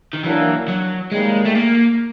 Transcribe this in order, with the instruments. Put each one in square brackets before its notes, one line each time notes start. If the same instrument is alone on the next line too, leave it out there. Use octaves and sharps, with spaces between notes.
[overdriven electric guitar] D#3
[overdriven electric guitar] E3 [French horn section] F#3 A#3 D4
[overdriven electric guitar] F#3
[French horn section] F#2 D#3 G3 A#3 [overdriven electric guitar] G#3
[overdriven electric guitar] A3
A#3